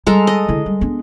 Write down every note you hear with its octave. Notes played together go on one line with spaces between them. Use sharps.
G3 G#3 A4 A#5
D#5
D3 E4
G3
B3 D4